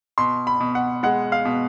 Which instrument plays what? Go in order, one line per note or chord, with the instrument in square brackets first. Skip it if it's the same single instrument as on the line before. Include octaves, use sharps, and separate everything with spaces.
[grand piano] B2 C6
B5
B2
F#5
G#3 F#5
F5
B2